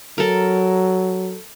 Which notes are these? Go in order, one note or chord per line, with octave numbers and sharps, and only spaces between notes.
F#3 A4 A#4